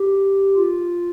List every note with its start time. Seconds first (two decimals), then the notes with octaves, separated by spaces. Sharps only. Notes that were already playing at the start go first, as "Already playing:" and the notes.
Already playing: G4
0.56 F4